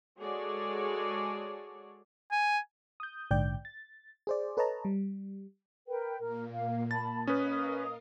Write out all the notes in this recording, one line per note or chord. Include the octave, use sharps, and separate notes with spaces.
G#3 F#4 G#4 A4 C#5 D5
G#5
D#6 G6
A#1 G#2 D3 D5 G5 G6
A6
G#4 C5 D5
A4 B4 C#5 D#5 A5 A#5
G3
A#4 B4 G5
A#2 A#3 A#4
F5
A5 B5 A6
C#4 A#4 B4 D#5 F5 D#6